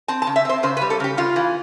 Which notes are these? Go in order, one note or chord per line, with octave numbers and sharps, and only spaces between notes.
C4 A5
A5
C#3
E5
C4 C5
C#3 C5
B4
G3
A4
C#3 G4
C#3 F4
E3